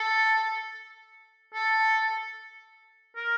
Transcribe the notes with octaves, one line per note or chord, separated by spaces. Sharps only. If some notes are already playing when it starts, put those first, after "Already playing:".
Already playing: A4
A4
A#4